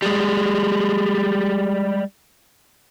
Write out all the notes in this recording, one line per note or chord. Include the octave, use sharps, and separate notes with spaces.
G3 G#3